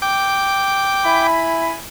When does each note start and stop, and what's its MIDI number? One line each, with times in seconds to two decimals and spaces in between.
0.02 1.27 79
0.02 1.27 86
1.05 1.75 64
1.05 1.75 80
1.05 1.75 83